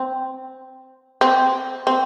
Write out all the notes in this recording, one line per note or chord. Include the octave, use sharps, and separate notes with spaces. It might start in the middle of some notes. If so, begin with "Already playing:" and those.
Already playing: C4
C4
C4